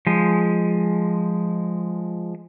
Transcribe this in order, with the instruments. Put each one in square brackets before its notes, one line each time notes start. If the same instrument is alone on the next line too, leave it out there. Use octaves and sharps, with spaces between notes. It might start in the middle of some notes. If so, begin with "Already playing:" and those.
[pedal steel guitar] F3 G#3